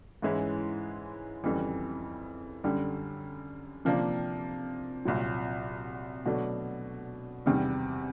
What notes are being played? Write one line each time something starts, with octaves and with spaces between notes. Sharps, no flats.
G#2 E3 G#3 C#4 E4
F2 C#3 E3 G3
F#2 D3 G3
C3 F3 A#3 D4
C2 A#2 F#3
B2 F#3 A3 D4
E2 C3 D#3 G3